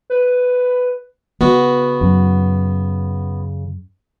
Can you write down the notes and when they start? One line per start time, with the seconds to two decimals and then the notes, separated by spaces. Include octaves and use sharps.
0.10 B4
1.41 C#3 B3 F#4
2.01 F#2